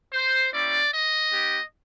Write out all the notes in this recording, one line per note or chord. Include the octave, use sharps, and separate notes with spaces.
C5
A#3 C#4 E4 G4 D5
D#5
B3 D#4 G4